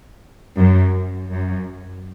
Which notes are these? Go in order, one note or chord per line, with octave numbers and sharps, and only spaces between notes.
F#2
F#2